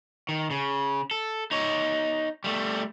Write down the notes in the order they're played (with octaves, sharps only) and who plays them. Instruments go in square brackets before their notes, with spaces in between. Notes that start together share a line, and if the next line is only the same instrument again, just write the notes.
[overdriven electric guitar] D#3
C#3
A4
D#4 C#5
G3 A3